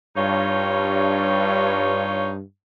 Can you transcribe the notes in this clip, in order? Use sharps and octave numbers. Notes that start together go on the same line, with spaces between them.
G2 D#4 F4 C#5